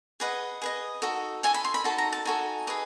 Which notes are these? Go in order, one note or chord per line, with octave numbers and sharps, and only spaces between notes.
G#4 B4 D#5 F#5
G#4 B4 D#5
D#4 F#4 A4
D#4 F#4 A4 G#5
B5
C6
B5
D#4 F#4 A4 A5
A#5
A5
D#4 F#4 A4 G#5
G#4 B4 D#5